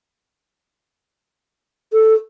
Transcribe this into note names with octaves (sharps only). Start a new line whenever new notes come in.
A4